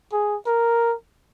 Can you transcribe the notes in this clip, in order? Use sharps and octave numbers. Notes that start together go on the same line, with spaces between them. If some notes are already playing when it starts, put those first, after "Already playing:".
G#4
A#4